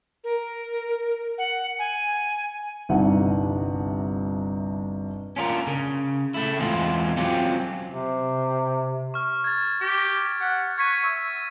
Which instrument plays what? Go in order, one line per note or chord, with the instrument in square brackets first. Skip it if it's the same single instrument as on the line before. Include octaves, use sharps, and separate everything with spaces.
[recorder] A#4
F#5
G#5
[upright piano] G1 C2 C3 D#4 F#5
[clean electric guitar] C#4 D4 F4 G4 A#4
C#3
A3 E4
E2 E3 G#3 C4 F4
F#3 C4 C#4 F4 G4
[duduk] C3
[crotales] C#6 F6
G#6 A6
[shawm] G4
F#5
[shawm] C#6 [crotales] G#6 B6 D#7
[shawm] E5